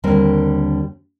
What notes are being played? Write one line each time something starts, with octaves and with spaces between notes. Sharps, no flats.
D#2 D3 G3 C4 D4 A#4